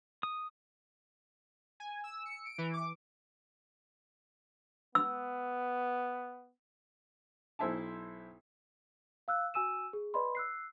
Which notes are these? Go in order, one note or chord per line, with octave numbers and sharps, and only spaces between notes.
D#6
G#5
E6
C#7
D7
E3
D6
B3 E6
B1 E4 C5 E5 G#5 A5
F5 E6 F#6
F#4 G#5 E6 D#7 E7
G#4
B4 D5 D#5 B5 C6
E6 F#6 C7